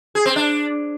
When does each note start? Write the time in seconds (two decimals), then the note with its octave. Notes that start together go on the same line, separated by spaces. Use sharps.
0.15 G#4
0.26 C4
0.36 D4